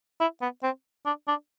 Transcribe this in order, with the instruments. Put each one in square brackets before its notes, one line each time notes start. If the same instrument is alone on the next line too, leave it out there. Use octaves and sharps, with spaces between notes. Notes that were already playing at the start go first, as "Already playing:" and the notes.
[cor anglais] E4
B3
C4
D4
D4